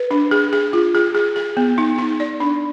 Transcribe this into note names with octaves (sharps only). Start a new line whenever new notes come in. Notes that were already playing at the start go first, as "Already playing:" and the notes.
Already playing: B4
D4
G#4
G#4
F4
G#4
G#4
G#4
B3
D#4
D#4
D5
D4